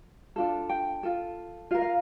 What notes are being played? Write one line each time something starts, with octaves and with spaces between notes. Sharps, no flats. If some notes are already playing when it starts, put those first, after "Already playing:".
D4 F4 A4
G5
F4 A4
F4 A#4 F5
F5